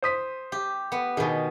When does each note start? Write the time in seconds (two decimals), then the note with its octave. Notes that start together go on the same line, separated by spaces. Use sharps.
0.02 C5 D#6 B6
0.52 G4
0.92 B3
1.17 B2 D#3 G#4